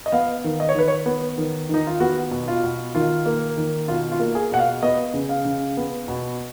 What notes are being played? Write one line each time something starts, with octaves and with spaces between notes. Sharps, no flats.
D#5
B3 F5
D#3
D#5
C#5
D#3 B4
C#5
B3
D#3
D#3 D#4
F4
B3 F#4
B2
F4
B2
D#3 F4
A#3
D#3
B2 F4
F4
A#3
G#4
B2 F#5
F5
B3 D#5
C#3
F5
C#3
B3
B2